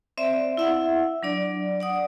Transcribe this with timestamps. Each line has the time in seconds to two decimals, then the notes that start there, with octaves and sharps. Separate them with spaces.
0.18 C4 C5 D5 E5
0.57 E4 E5 F#5
1.23 F#3 D4 D5
1.80 D5 F#5 D#6